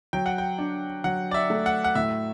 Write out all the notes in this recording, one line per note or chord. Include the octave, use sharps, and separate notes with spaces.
F#3 G5
F#5
G5
D4
F#3 F#5
D5
E5
A3
F#5
F#5
A2 E5